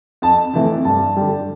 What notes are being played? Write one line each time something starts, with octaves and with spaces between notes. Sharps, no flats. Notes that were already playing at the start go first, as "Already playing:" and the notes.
F2 A5
C3 E3 A3
G2 A5
D3 G3